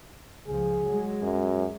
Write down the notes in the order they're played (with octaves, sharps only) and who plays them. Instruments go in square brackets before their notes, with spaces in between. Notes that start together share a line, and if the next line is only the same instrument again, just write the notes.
[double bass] C#2 F3 [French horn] G#4
[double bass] F#3 G#3
[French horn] F#2